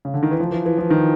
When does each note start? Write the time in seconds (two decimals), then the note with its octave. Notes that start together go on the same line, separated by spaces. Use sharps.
0.05 C#3
0.14 D3
0.23 D#3
0.31 E3
0.40 F3
0.52 E3
0.66 E3
0.78 F3
0.90 D#3